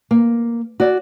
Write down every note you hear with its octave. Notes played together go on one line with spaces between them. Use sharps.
A#3
F#4 D5